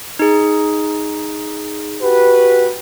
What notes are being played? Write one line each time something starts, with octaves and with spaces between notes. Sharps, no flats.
D#4 G#4
F#4 G4 B4